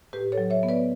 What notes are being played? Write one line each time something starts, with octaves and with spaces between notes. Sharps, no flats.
A2 G4 B4
A4 C#5
F#3
C#5 E5
B3
B4 D5